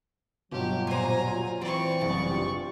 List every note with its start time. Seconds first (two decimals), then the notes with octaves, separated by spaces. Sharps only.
0.52 G1 B2 F#3 F4 G4
0.87 A#2 C5 G#5 A#5
1.27 F4
1.61 E3 C4 D5 C#6
2.01 F#1 C2 C#3
2.30 D4 F4 G4